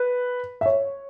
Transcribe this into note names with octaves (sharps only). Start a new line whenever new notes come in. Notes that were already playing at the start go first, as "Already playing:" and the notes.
Already playing: B4
E5
C#5